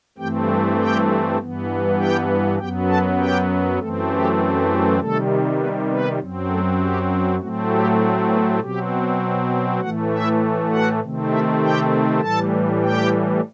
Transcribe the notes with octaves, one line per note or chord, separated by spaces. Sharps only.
G2 E3 A3 C4 G4 G5
G4 G5
G2 E3 B3
G4 G5
F#2 F#3 B3 G4 G5
A4 A5
G4 G5
F#2 E3 A3 C4 A4
G4
G4
C3 D#3 G3 A3 A4
B3 B4
B3 B4
F#2 F#3 C4
A3 A4
G4
A2 F#3 A3 C4 F#4
G4
B3 B4
B2 F#3 C4 G4
A2 E3 A3 F#4 F#5
E4 E5
F#4 F#5
C3 D#3 A3 C4
E4 E5
G4 G5
A2 E3 G3 A4 A5
G4 G5